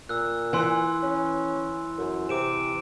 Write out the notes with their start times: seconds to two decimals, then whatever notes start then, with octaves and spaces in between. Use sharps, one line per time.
0.09 A#2 E6 F#6
0.53 E3 G#5 C6 E6
1.03 C#4
1.98 F#2
2.29 C3 D6 D7 E7